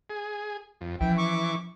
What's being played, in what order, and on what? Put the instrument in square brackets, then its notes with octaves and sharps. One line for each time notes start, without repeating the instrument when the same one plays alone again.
[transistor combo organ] G#4
F2
[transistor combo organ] E3 [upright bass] F3 C#4 [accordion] G5
[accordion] C#6 D6